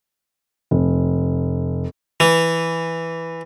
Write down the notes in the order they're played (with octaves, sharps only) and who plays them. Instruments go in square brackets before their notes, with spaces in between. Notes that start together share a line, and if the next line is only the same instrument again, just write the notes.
[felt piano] F1
[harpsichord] E3